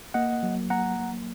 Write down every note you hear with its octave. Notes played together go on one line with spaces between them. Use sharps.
A#3 D#5 F#5
F#3
A#3 F#5 A#5
F#3